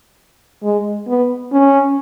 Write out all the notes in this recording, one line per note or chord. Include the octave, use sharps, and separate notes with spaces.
G#3
B3
C#4